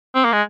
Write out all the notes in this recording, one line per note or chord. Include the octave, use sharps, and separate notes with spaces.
C4
A#3
G#3